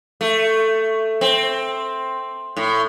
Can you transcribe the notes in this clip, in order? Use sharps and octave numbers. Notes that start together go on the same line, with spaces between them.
A3
C4
A2